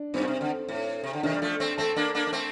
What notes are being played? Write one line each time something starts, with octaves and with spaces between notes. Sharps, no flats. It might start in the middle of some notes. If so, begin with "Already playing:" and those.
Already playing: D4
G2 C4
A#2
C3
D3
A2
C3
D3
C3 D#3 D4
G3
F3 A3
A3 C4
A3 C4 A4
A#3 D4
A#3 D4
D4
A3 C4